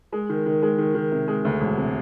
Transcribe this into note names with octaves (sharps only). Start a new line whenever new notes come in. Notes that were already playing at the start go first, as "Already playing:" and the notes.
G#3
D#3
D#3
G#3
D#3
D#3
C3
G#3
D2
E1
C3